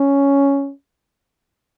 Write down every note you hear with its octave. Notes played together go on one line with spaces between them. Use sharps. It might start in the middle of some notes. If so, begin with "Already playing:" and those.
Already playing: C#4